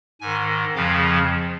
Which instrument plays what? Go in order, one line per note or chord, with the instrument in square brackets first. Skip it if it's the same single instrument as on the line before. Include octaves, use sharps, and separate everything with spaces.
[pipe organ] G#2 D#3 G#5
F2 C#3 F3 F5